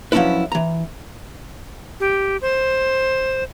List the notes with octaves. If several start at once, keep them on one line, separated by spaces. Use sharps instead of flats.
F3 F#3 C#4 D4 E4 B4
E3 A#5
G4
C5